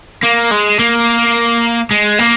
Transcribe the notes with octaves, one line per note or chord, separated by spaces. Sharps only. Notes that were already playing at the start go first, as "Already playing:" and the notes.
A#3
G#3
A#3
G#3
A#3